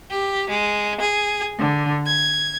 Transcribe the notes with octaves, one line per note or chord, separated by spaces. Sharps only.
G4
G#3
G#4
D3
G#6